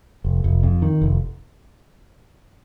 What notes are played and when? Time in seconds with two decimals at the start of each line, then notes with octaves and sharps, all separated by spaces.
0.24 F1
0.44 F1
0.63 F2
0.82 D#3
1.02 F1